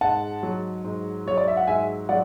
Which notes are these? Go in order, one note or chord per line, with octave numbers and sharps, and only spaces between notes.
G#2 F#5 A5
F#3
G#2
F#3 C#5
D5
E5
F#5
G#2 E5 G#5
F#3 D5 F#5